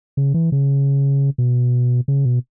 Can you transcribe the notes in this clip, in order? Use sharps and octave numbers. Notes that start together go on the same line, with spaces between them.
C#3
E3
C#3
B2
C#3
B2